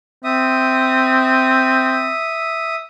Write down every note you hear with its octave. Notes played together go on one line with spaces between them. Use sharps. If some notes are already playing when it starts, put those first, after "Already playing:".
C4 E5 D#6